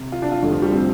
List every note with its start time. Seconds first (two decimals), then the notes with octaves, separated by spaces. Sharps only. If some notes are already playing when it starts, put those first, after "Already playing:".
Already playing: C3
0.12 F4
0.22 D4
0.32 F4
0.42 F1 F2 D3
0.52 F3
0.62 G3
0.72 C4